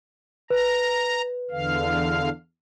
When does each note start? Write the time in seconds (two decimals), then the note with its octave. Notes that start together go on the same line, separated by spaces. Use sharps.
0.50 B4 A#5
1.51 E2 D3 F5